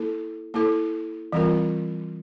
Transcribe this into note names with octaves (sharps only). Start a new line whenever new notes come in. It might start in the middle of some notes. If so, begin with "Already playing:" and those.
Already playing: A#3 E4 A4
A#3 E4 A4
E3 G3 C4 F4 A#4